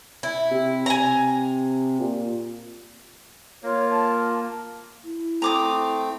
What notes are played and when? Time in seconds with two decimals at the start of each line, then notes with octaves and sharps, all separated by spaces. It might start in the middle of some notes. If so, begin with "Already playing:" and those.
0.23 E4
0.51 C3
0.86 G#5 A#5
2.00 A#2
3.63 A#3 F4 C#5
3.90 A5
5.04 E4
5.42 A3 C4 A#5 D6 D#6